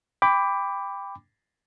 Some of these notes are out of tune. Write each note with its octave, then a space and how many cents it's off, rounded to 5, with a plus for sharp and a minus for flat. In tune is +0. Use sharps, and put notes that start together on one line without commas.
G5 +20 B5 +15 D6 -5